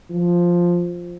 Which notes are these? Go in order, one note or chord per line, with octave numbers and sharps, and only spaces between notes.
F3